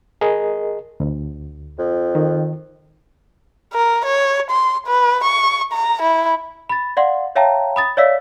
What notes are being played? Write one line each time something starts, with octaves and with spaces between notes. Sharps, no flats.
G#4 A#4 D#5
D2
F2
D#3
A#4
C#5
C6
B4
C#6
A#5
E4
B5 A6
D5 F5 F#5 C6
C#5 E5 F5 G5 A5 A#5
B5 D#6 A6
C#5 D5 E5 F5 E6 B6